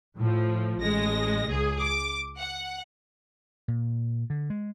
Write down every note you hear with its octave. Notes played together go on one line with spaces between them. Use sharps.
A2 F3
A1 G#3 A#6
C#2 G#4
D6
F#5
A#2
D3
G#3